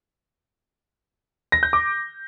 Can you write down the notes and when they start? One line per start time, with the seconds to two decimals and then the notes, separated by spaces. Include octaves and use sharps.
1.52 A#6
1.63 G6
1.73 D6